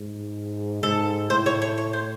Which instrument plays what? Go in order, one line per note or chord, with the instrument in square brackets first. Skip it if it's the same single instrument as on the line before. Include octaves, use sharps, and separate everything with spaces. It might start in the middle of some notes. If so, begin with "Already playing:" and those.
Already playing: [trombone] G#2
[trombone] G#2 [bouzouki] A4
[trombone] A2 [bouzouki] C5
[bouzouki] C#5
C#5
C#5
C5